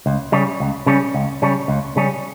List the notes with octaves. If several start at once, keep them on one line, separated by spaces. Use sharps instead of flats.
C#2
C#3 G3 C#4
C#2
C#3 G3 C#4
C#2
C#3 G3 C#4
C#2
C#3 G3 C#4